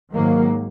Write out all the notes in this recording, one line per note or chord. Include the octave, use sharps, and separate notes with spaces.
G#2 D#3 F#3 A#3